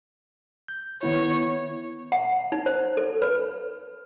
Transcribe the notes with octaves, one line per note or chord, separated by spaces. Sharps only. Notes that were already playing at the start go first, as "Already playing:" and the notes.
G6
D#3 B3 E4 C#5
F#5
D#4
C5
A4
B4